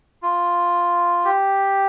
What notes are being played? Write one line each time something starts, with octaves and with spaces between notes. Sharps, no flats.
F4
G4